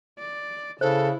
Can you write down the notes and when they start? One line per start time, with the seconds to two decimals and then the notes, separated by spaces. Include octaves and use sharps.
0.19 D5
0.81 C#3 E4 A4 C5